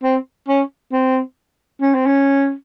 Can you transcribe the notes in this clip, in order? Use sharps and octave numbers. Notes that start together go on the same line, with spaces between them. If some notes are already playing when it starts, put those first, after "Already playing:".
C4
C#4
C4
C#4
C4
C#4